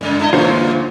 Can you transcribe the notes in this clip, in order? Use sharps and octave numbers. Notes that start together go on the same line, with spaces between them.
F#2 A#2 C#3 G#3
D4 E4 D#5
D2 G2 A#2 E3 A#3 F4 C5 C#5